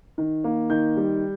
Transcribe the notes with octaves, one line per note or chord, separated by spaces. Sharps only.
D#3
A#3
D#3 G6
G3